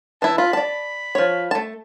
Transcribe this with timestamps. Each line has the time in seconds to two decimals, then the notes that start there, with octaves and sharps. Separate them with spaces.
0.22 E3 E4 A5
0.38 F4 B5
0.53 D5 A5
1.15 F3 C#5
1.51 A3 A5